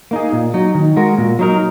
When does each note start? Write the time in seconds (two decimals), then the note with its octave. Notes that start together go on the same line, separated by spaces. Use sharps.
0.11 A#3 D#4 G#4
0.33 A#2
0.54 F#3 D#4
0.75 D#3
0.97 G#3 F#4 A#4
1.18 A#2
1.39 F#3 D#4 A#4